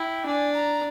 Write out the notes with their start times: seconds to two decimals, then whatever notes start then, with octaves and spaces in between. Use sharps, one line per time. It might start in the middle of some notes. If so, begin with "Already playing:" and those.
Already playing: E4 G5
0.26 D4 G#5
0.54 A#5